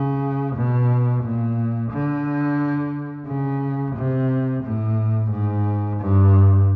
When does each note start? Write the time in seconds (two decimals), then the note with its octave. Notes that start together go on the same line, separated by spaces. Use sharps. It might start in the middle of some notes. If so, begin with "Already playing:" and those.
Already playing: C#3
0.56 B2
1.23 A#2
1.91 D3
3.27 C#3
3.95 C3
4.63 A2
5.31 G#2
5.99 G2